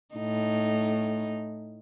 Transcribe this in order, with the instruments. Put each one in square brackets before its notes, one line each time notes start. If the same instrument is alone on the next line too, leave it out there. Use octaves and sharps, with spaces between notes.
[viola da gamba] A2 D#4